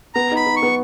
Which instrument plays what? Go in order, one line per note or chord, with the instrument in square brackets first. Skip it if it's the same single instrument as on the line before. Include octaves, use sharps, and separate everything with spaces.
[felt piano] B3 [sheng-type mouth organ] A#5
[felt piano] D#4
[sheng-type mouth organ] B5
[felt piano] D#4
[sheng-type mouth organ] C#6
[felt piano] B3